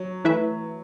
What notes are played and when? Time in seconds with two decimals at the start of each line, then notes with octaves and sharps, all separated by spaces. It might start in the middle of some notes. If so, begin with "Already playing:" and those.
Already playing: F#3
0.24 E3 A3 E4 B4 E5